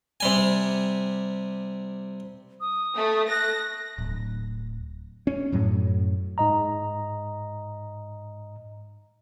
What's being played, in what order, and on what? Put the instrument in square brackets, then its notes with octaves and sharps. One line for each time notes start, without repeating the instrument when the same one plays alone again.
[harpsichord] C3 G3 G#5
[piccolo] D#6
[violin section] A3
[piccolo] F#6 [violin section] A#6
[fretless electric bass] D1
C#4
F#2 A2 F#3
[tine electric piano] G#2 D#5 A#5